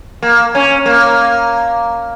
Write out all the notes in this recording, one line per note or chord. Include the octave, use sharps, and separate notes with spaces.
A#3
C#4
A#3